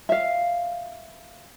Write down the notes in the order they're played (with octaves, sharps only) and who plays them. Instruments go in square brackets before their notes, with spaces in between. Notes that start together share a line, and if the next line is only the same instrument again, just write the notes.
[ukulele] E5 F5